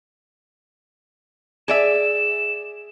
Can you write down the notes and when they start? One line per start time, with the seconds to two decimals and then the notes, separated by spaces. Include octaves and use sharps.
1.68 G#4 D5 E5 E7